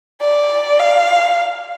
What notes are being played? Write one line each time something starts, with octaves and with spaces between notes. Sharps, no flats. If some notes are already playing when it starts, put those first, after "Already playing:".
D5
F5